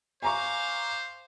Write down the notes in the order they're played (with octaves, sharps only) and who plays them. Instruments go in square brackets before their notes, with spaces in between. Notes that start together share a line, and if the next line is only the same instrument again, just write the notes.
[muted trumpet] C5 [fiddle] F5 D6 [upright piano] G#5 A#5 C#6